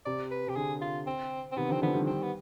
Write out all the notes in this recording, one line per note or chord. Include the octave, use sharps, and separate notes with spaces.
C3 D5
B4
C3 G4
D3 G#4
F4
C4
C4
C3 D#3 B3
D3 F3 C4
D3 F3 B3
D#3 G3
C4
B3